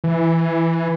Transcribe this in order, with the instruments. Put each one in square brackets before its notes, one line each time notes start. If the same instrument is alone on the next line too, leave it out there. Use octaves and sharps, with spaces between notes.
[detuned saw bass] E3